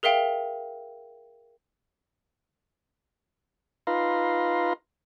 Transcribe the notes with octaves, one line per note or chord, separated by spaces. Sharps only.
G#4 A#4 E5 F5 G5
D#4 F4 B4 F5 A#5 C6